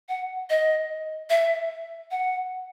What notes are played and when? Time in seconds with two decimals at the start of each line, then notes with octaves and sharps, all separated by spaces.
0.09 F#5
0.50 D#5
1.30 E5
2.11 F#5